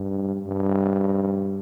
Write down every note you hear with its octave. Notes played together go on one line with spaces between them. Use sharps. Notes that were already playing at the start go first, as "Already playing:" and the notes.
Already playing: G2
G2